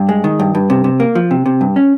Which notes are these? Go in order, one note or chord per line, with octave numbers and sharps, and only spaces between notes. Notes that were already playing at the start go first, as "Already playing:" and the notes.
Already playing: G2
G#3
D#3
G2
G2
C3
C3
A#3
F3
C3
C3
G2
C#4